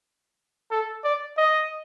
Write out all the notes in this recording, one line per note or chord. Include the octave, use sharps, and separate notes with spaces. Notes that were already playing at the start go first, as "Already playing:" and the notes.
A4
D5
D#5